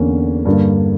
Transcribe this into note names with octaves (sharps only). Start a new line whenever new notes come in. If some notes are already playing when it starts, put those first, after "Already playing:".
Already playing: E2 D3 A#3 C#4
G2 D3 A#3